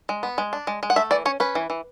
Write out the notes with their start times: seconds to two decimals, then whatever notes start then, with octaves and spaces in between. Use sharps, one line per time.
0.09 G#3
0.23 B3
0.38 G#3
0.53 D4
0.67 G#3
0.83 G#3
0.90 F#5
0.96 A3 E5
1.11 E3 D5
1.25 C#4 C#5
1.40 C#4 B4
1.55 E3
1.70 E3